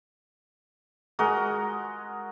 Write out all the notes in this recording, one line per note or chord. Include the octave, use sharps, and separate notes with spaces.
G#3 F#4 A#4 D#5